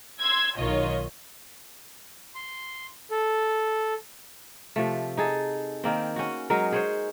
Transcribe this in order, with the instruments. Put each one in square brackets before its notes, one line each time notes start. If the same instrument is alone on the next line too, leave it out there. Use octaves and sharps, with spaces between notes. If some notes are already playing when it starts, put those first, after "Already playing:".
[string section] C6 E6 G#6
B1 D#3 F4 C#5 D#5
[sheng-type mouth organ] C6
A4
[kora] C3 F3 A3
D#4 G#4 A4
D#3 A#3 C4
C#4 F#4
F#3 G#3 D#4 A#4
G#4 C5 C#5